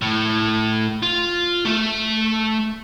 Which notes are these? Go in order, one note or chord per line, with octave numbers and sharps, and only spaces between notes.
A2
F4
A3 E5